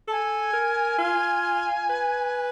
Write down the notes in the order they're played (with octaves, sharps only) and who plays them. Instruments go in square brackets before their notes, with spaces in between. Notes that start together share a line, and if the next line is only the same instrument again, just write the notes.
[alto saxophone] A4 [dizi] G#5 A5
[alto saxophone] A#4
F4
B4